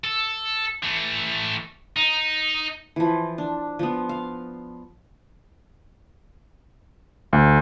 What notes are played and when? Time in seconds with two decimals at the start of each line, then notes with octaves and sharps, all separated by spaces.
0.04 A4
0.83 E3 A3
1.96 D#4
2.96 E3 F3
3.38 D4
3.79 F3 B3
4.09 F5
7.33 D2